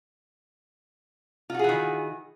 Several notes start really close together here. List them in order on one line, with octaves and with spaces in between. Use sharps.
F4 F#4 G#4 E3 D#3